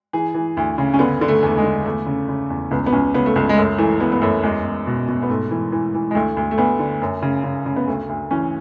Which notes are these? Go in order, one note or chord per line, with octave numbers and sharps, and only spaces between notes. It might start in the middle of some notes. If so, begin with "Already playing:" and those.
E3 G#4
E3
D2
C#3
C#4
D3 B3
D3
A3
E2 A3
G#3
D3
E2 A3
C#3
C#3
E2
C#2 B3
B3
C#2 C#4
C#3 B3
A3
C#2 B3
G#3
F#2 A3
E3 A3
E3 B3
B3
F#2 A3
E2 G#3
E2
B2
B2
B3
G#2 A3
E3
E3
E3
G#3
D2 A3
D2
A3
D2 B3
D3
F#2
C#3
C#3
C#3
B3
D2 A3
D2
E3 C#4